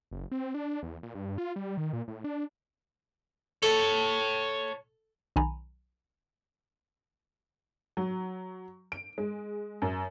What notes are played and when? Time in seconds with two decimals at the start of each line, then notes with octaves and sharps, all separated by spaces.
0.11 F#1
0.31 C4
0.54 D4
0.83 E2
1.03 A#2
1.15 G2
1.38 F4
1.56 G3
1.77 D#3
1.93 A#2
2.08 A2
2.24 D4
3.63 A4 C#5 A5
5.36 B1 D#3 G#5 A#5 B5
7.97 F#3
8.92 D7
9.18 G#3
9.82 F#2